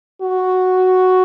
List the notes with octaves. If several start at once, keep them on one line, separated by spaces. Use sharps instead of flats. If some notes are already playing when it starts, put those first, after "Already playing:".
F#4